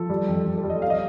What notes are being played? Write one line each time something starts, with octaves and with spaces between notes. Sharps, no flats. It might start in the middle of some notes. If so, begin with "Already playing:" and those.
Already playing: F3 A4
G3
F2
F2
A4
G3
D#5
G3 F5
D#5